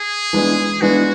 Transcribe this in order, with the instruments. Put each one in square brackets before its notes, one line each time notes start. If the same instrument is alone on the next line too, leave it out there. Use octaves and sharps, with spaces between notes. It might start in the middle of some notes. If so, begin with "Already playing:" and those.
Already playing: [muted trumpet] G#4
[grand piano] E3 G#3 B3 D4
[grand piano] E3 G#3 B3 D4 [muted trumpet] F#4